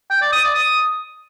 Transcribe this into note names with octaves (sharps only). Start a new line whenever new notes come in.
G5
D5
D#6
D5
D#6